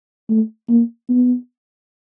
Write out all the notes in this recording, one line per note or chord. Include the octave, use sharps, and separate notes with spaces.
A3
A#3
B3